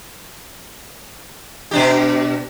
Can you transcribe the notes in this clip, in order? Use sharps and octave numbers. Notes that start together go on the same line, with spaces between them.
B2 D4 G4